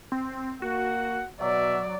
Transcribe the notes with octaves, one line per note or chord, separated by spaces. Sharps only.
C4
A#3 F#4 F#5
B2 F#3 D5 E5